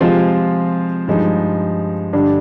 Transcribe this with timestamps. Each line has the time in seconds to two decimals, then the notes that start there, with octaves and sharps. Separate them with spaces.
0.01 C3 F3 G#3 C4 F4
1.07 G2 F3 G#3 D#4
2.13 G2 D3 G3 D4